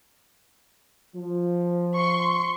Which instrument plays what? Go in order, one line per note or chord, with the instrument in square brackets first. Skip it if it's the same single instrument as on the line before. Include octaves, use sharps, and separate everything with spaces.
[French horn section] F3
[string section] C6 C#6